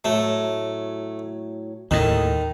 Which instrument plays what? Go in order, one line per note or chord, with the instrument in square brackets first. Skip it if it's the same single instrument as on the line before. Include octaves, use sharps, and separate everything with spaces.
[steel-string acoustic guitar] A2 F#3 [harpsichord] A3
[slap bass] D#2 A2 [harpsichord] D#3